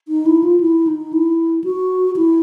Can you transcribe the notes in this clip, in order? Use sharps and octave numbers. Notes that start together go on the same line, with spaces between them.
D#4
E4
F4
E4
D#4
E4
F#4
E4